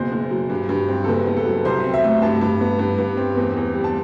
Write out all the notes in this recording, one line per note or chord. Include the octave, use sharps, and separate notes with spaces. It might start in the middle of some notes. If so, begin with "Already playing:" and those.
Already playing: F#1 B2 C5
F#1
F#3
G2
G2
C4
A4
F#1 B4
B3
A4
F#3
C2 C5
C4
E5
A3
G2 A5
G2
B3
G2
G2
C4
E2
E2
G3
A5